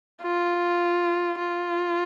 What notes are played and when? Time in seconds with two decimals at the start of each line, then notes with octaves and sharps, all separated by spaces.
0.23 F4
1.38 F4